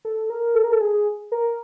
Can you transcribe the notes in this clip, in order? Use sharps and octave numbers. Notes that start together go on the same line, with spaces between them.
A4
A#4
A4
A#4
A4
G#4
A#4